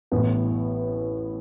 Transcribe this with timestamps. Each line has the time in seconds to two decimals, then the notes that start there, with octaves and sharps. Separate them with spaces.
0.12 A1 A2 B3